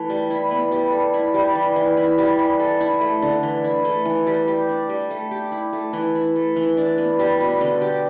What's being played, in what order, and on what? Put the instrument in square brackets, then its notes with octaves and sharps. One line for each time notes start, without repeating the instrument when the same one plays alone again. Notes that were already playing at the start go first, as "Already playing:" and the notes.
Already playing: [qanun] E3 A3
G3
E4
B3
G3
A4
E4
G3
E3
E3
E4
G3
E3
A4
E4
A3
D3
E3
E4
A3
E3
G3
G4
D4
G3
A3
G4
E4
A3
E3
E4
A3
E3
D4
B3
G3
B2
D3
G4